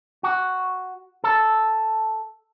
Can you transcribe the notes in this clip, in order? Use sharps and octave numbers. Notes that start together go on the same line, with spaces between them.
F#4
A4